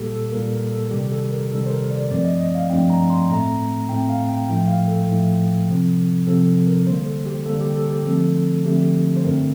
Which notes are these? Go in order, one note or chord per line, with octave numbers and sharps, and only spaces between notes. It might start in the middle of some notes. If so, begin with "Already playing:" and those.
Already playing: A#2 G3 A#3 G4 A4
A4
A#2 G3 A#3 A#4
A#4
A4
C3 D#3 G3 G4
A4
A#4
C3 D#3 G3 A4
C5
A#4
D5
G2 F3 A3 C4 D5
D#5
D#5
F5
G2 F3 A3 C4 G5
A#5
C6
A2 A3 C4 A#5
A2 A3 C4 G5
F5
G5
A2 F3 A3 G5
F5
A4
A2 F3 A3
C3 F3 C4
C3 F3 C4 A4
A#4
D3 G3 A#3 C5
A4
G4
D3 G3 A#3 A4
G4
A4
G4
D3 F3 A3 C4 A4
D3 F3 A3 C4 G4
C5
G2 D3 A3 C4 A#4